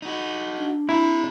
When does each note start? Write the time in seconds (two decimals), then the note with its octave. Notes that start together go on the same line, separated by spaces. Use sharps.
0.02 D#4 F#4
0.58 D4
0.89 C4 E4 A#5